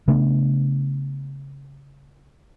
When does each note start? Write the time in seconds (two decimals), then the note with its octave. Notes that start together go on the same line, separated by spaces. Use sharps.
0.08 C#3 A3 B3 D4